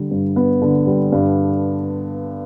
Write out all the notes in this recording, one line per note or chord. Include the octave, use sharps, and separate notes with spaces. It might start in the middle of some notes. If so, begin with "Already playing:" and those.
Already playing: D3 G3
G2
B3
D3
G3
G2